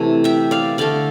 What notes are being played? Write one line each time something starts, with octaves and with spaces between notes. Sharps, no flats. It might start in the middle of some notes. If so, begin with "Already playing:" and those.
Already playing: C3 E3 A3
E5 G5
D5 F5
D3 A3 D5 F5